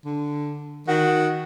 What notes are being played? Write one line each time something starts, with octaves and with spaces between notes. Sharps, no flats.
D3
D#3 F#4